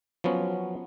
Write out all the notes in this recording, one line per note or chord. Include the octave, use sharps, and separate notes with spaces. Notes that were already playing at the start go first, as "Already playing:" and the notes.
F3 F#3 B3 C#4